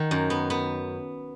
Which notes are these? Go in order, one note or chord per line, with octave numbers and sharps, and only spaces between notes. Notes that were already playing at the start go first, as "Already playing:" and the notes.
Already playing: D#3 F#5
F#2
B3
B3